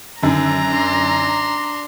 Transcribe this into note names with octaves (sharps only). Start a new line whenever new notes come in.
F#2 D3 D#3 A#5
D4 C6